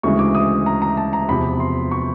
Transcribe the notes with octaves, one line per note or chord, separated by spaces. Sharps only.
D2 C#3 E3 G#3 C#6
D6
D#6
A#5
A#5
A5
A#5
E2 C3 F3 B5
C6
C#6